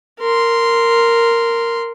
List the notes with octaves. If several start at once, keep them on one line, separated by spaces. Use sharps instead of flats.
A#4 C6